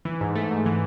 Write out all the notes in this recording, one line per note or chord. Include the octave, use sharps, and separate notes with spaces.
E3
G#2
A3
G#2
E3